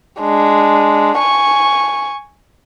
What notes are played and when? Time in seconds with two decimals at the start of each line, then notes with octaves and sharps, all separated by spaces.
0.20 G#3 D4
1.18 G#5 C#6